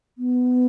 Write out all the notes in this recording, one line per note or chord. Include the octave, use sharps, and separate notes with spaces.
B3